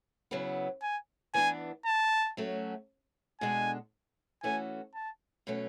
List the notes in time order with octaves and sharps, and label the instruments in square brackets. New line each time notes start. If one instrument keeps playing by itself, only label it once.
[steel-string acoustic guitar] C#3 F#3 B3 E4
[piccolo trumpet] G#5
[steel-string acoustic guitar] E3 B3 D4 [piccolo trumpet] G#5
[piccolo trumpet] A5
[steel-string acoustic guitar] F#3 A3 C#4 F#4
[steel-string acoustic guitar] B2 G#3 D4 A4 [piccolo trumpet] G#5
[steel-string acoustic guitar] E3 A3 C#4 F#4 A4 [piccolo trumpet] G#5
[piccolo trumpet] A5
[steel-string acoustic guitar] B2 F#3 A3 C#4